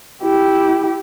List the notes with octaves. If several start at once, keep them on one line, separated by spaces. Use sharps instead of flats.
E4 G4